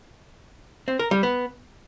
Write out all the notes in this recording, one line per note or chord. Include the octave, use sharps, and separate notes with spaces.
C4
A#4
G3
B3